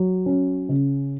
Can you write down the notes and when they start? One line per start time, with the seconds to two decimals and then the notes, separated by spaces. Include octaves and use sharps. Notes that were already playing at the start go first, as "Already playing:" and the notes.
Already playing: F#3
0.26 C#4
0.69 C#3